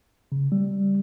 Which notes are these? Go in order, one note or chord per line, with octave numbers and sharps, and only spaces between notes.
C#3
G3